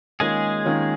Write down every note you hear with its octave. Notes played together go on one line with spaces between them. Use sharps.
D#3 G#3 A#3 C#4 F4 G#4
D#3 A#3 C#4 F4